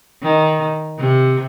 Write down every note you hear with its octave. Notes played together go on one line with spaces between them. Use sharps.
D#3
C3